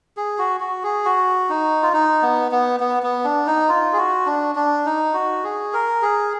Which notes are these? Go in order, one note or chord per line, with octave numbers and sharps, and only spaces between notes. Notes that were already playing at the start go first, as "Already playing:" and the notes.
G#4
F#4
F#4
G#4
F#4
D#4
F4
D#4
B3
B3
B3
B3
D4
D#4
F4
G#4
F#4
D4
D4
D#4
F#4
G#4
A#4
G#4